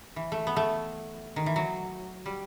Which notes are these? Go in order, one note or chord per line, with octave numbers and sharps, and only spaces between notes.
E3
A3
B3
A3
D#3
E3
F#3
G3